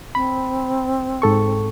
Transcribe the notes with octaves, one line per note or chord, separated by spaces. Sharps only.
C4 B5
G#2 A4 C#6